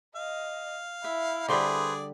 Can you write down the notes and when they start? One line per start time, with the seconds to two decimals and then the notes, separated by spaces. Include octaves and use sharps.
0.16 D#5 F5
1.04 E4 E5
1.48 D3 G3 G#4 B4 C5 D5 C6